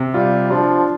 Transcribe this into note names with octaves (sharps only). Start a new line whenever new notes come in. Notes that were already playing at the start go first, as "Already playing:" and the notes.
Already playing: C3
G3 F4
F3 D4